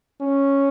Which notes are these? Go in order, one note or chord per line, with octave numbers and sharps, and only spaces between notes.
C#4